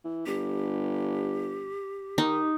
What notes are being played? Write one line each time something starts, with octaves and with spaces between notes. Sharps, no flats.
E3
G1 G4
D#3 D#4